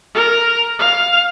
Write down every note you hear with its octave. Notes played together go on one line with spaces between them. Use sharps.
A#4
F5